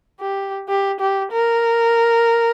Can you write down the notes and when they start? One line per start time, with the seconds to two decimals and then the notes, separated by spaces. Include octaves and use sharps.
0.20 G4
0.69 G4
1.00 G4
1.32 A#4